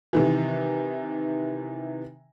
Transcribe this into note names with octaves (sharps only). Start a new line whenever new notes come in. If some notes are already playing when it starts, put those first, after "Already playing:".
C3 D#3 E3